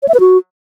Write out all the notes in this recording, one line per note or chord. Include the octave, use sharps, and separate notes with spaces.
C#5
E5
B4
F#4